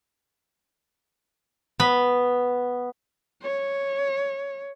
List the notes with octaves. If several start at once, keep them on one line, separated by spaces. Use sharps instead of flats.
B3 B5
C#5